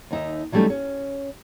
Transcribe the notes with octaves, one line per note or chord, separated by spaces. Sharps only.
D#2 D#4 E5
E3 F#3 G3 A3 C#4 D#4
C#4